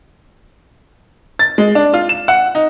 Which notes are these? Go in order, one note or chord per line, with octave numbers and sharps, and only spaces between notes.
A6
G#3
D4
F4
E7
F#5
D#4